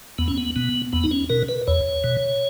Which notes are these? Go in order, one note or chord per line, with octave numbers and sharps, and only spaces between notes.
E2 B3
C#4
B3
B2 B3
E2 B3
D#4
C#4
B2 A#4
B4
E2 C#5
B2